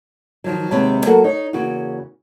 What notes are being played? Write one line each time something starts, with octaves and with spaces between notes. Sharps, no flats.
D#3 F3 F#3
D#2 C3 G#3 B3 C#5 A5
F#3 A#3 F#4 A4 A#4 F#5
D#4 C#5
E2 C#3 A#3 F#4